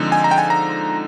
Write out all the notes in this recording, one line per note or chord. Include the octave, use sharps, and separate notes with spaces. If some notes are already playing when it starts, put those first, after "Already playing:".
Already playing: D3 F3 G#3 C4 D#4
G#5
A#5
G5
G#5
A#5